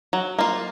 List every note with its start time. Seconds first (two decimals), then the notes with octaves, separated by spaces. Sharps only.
0.13 F#3
0.39 A#3 F4